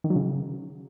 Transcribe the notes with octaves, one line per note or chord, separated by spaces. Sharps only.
D#3
F#3
C#3